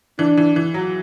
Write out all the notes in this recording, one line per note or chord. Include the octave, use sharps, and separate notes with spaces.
E3 D4
E3
E3
F#3